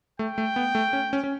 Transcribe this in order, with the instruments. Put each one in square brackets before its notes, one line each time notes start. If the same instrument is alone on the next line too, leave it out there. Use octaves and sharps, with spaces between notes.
[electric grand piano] A3 [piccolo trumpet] G5
[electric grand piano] A3
B3
A3
C#4
C#4
C#4